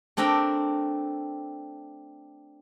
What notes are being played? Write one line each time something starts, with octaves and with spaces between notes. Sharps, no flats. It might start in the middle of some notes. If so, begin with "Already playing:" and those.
A3 C4 D4 A#4 E5 G5